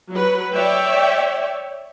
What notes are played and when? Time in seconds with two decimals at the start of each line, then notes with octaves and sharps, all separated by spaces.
0.11 F#3 B4
0.55 C#5 D5 E5 G5